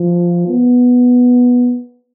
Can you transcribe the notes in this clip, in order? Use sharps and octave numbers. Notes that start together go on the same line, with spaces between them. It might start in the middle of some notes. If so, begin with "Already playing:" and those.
Already playing: F3
B3